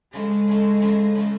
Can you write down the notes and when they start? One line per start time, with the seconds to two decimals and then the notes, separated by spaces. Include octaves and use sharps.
0.13 C#3 F3 G#3 A3
0.48 C#3 F3 A3
0.82 C#3 F3 A3
1.15 C#3 F3 A3